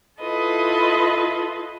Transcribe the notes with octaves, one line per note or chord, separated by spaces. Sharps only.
E4 F4 A4 B4 D#5